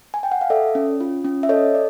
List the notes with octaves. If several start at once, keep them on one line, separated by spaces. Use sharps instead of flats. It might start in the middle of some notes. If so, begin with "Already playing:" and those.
G#5
G5
F#5
F5
A4 D5 E5
C#4
F4
C#4
E5
A4 C#5 D#5
D5